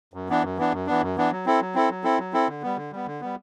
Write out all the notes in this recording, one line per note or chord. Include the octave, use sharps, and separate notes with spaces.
F#2
E3 B3 D4
F#2
E3 B3 D4
F#2
E3 B3 D4
F#2
E3 B3 D4
F#3
C4 E4 A4
F#3
C4 E4 A4
F#3
C4 E4 A4
F#3
C4 E4 A4
D3
G3 B3
D3
G3 B3
D3
G3 B3